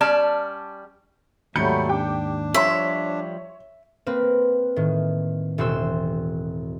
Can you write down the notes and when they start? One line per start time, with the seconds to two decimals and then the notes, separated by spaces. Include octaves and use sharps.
0.01 G3 C#4 D5 A5
1.56 D#2 G#2 F#3 G3 A3 B5 G6 C#7
1.89 D4 G4 G5 D6
2.54 F3 G3 C#5 E5 C6
4.06 A#3 C4 B4
4.76 A2 D#3
5.58 E1 C4 F#4 C6 E6